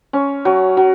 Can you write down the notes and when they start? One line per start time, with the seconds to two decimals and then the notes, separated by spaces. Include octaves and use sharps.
0.13 C#4
0.45 F#3
0.77 F#3